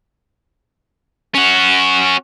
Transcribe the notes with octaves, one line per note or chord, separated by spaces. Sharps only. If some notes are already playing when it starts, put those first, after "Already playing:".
C#4 F#4